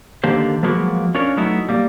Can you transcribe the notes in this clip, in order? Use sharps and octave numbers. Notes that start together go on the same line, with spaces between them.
D3 D#3 A#3 G4 C5
F3 F#3 G#3 A#3 B3 F#4
C#4 D4 F4 A#4 C#5
F#3 A3 B3 D#4 E4 F#4
G3 A#3